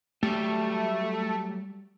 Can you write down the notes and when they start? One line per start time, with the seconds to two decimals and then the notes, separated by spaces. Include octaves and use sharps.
0.23 F#3 G3 A3 G4